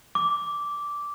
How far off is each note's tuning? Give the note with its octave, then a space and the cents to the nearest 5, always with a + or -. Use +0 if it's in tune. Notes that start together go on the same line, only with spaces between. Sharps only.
D6 -10